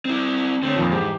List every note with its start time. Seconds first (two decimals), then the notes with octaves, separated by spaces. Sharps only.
0.05 C4 E4
0.63 D3 A3 C4 C5 C#5
0.76 F2 A#2 D#3 F3
0.91 G#2 E3 G4 C5